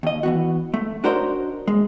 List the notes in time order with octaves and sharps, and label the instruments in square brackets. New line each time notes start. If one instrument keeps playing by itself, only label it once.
[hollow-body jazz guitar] D#2 D#5
E3 B3 F#4
A3
D4 F#4 A#4 C5 C#5 D#5
G#3